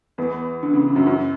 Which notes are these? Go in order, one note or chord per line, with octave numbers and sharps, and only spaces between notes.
E2 E3
D3
C#3
D3
F#2 F#3
F#2 F#3